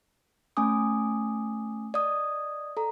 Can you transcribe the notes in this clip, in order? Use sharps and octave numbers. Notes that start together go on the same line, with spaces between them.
A3 C#4 G#5 D6 D#6
D5 D#5 D#6
A4 A#5